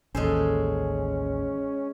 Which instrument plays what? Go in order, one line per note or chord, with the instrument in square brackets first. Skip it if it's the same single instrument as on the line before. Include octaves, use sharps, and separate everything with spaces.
[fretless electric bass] A1 D#2 [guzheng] G#3 A4 C5 [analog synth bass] C#4